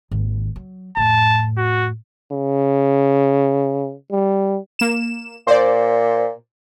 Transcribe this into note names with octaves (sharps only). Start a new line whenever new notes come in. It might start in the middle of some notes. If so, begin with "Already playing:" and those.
G#1 D#2
F#3
F2 A2 A5
F#4
C#3
G3
A#3 E7
A#2 C5 D5